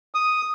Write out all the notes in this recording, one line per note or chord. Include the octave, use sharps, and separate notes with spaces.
D#6